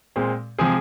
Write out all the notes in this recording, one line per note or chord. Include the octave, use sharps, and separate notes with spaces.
A#2 G#3 C4
C3 F3 G#3 C4 G#4